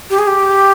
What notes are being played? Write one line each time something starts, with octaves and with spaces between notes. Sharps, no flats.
G4
G#4
G4